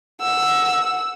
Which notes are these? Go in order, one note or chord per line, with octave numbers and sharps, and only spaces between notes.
F#5 E6